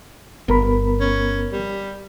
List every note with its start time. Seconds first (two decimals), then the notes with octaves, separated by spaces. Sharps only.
0.48 G1 B3 A#4 B5
1.00 C#4
1.52 G3